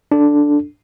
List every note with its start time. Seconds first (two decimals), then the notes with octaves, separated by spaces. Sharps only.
0.12 D4 A4